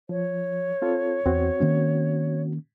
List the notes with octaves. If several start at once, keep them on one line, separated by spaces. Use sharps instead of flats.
F3 C#5
C4 F4 A4
E2 C4 F#4
D#3 A#3 C#4